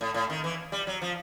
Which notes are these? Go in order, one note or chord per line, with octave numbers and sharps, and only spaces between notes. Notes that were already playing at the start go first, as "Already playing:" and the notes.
A2
A2
D#3
E3
G3
F#3
F3